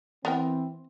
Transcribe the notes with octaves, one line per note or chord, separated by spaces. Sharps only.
E3 B3 C4 A#4 G5